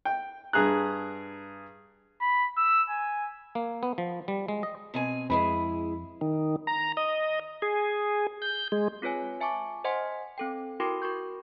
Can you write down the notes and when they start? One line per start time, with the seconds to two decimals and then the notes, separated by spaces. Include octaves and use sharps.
0.05 G5
0.53 G2 G#4 A#5 F#6
2.21 B5
2.57 E6
2.90 G#5
3.55 A#3
3.83 B3
3.98 F3
4.28 G3
4.48 G#3
4.63 D#5
4.94 B2 C4 G#5
5.30 F2 G#3 E4 G#4 B4
6.21 D#3
6.67 A#5
6.97 D#5
7.62 G#4
8.42 G6
8.72 G#3
9.02 C4 F4 B4 C#5 G#5
9.41 E5 G#5 A5 C#6 D6
9.84 C5 D#5 F#5 G#5 C6
10.38 C4 A4 G5
10.80 E4 F#4 A#4 G5 C6 D6
11.02 F#4 A#4 C#6 G6